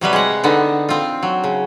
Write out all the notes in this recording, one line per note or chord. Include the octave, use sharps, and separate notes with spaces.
C3 F#3 G3 B4
G#3 F#5
D3 B3 D#4
C4 F4
F#3
C#3